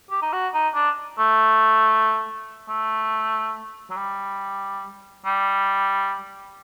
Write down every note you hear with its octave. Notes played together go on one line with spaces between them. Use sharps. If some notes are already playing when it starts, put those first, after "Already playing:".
G4
D#4
F#4
D#4
D4
A3
A3
F#3
G3
G3